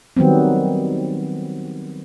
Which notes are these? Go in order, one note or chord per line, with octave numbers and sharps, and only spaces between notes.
D#3 F#3 G3 B3 C4